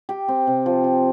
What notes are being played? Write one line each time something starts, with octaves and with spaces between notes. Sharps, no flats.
G4
C4
C3
F3
G4